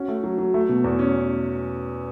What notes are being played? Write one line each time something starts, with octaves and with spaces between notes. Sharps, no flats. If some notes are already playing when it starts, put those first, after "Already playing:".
Already playing: C#4 F#4
A3
F#3
F#3
A3
B2
E2
C#4